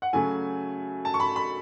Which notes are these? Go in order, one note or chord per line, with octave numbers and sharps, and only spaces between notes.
F#5
C#3 F#3 A3 G#5
A5
C#6
B5
B5